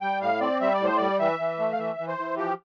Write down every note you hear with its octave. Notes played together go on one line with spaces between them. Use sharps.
G3 G5
A2 F5
C4 D5
G3 E5
D5
A2 C5
G3 D5
E3 E5
E3
A3
F5
E3 E5
E3
C5
E3
F3 G4